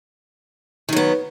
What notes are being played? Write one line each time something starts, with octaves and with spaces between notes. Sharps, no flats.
D#3 F#3 B3